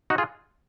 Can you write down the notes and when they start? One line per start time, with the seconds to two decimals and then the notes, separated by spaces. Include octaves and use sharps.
0.10 D#4 F#4
0.18 F4 G#4